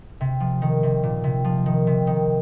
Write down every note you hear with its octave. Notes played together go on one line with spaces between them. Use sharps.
C3
F3
D#3
C3
A#2
C3
F3
D#3
C3
D#3